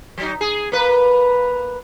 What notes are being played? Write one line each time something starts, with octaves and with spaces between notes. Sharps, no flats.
F#3 D#4
G#4
A#3 B4